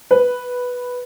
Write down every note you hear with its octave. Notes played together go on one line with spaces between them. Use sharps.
B4